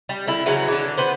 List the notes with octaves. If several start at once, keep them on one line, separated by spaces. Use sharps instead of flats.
G3
D3 E4
C#3 E3 F#3
D3 E3
B3 B4 C5